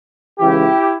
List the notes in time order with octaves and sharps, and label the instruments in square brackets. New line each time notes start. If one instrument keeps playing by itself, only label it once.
[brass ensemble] C#2 C#3 E3 E4 G4